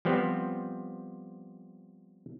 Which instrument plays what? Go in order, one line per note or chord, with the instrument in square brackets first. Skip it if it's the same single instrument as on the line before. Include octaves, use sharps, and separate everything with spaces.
[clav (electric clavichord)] F3 G3 B3 C4